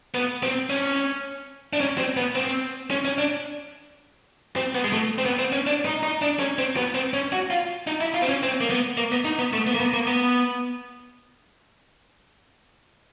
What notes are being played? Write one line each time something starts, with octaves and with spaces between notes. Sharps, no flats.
B3
C4
C#4
D4
C#4
C4
B3
C4
C#4
C#4
D4
C4
B3
G#3
A3
C4
B3
C4
C#4
D4
D#4
D#4
D4
C#4
C4
B3
C4
C#4
F#4
F4
D#4
E4
F4
C4
C#4
C4
A#3
B3
A#3
B3
D#4
B3
A3
B3
A#3
B3
A#3
B3